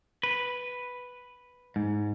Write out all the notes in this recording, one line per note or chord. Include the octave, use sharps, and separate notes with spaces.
B4
G#2